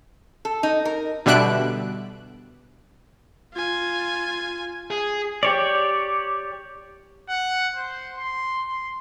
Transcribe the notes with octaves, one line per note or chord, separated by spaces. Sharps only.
A4
D#4
A#4
B2 D3 G3 E5 F#6 D7
F4 G#5
G#4
G4 C#5 D5
F#5
C5
C6
C6